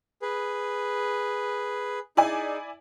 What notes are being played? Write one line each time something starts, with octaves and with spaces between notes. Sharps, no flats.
G#4 B4
D#4 E4 G#4 D5 G#5